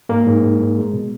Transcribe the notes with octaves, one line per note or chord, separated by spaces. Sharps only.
G#2 A#3 A#4
G#2
G#2
G#2
G#3
B2